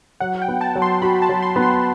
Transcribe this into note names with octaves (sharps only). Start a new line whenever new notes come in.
F#3 F#5
G5
B3
A5
F#3
C6
F#4 B5
A5
F#3
C6
B3
C6